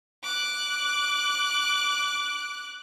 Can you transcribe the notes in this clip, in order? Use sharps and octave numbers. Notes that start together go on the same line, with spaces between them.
D6 F#6